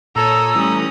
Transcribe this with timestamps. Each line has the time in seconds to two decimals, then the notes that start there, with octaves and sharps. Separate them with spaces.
0.16 A#2 A4 C#5 A#5 D#6 E6
0.55 E3 G3 A3 C#4 D#6